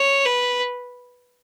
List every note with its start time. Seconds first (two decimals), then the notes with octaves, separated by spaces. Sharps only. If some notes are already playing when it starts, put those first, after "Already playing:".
Already playing: C#5
0.25 B4